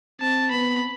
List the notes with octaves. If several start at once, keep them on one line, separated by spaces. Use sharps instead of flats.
C4 A5
B3 B5